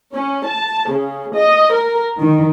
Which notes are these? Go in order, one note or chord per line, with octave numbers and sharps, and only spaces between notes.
C#4
A5
C#3
D#5
A#4
D#3